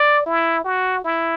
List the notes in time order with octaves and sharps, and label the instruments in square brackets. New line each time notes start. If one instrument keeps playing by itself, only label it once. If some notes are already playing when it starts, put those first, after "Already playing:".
Already playing: [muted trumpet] D5
E4
F#4
E4